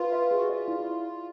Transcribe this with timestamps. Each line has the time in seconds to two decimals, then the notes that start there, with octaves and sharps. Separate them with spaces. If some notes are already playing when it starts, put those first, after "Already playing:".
Already playing: F4 B4
0.12 E5
0.31 G#4
0.37 F#4
0.50 F4 D5
0.68 E4